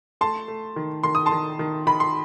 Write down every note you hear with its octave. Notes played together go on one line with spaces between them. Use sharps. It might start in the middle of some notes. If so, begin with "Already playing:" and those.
A3 A5 C6
A3
D#3
D#3 C6
D#6
A5 C6
D#3
D#3
D#3 B5
C6